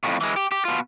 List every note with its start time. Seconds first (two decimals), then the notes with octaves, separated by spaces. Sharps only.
0.04 F2 A2
0.21 E3 G#3
0.36 G4
0.52 G4
0.65 B2 F4